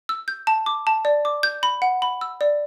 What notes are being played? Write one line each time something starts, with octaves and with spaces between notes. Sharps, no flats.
E6
G6
A5
D6
A5
D5
D6
G6
B5
F#5
B5
E6
D5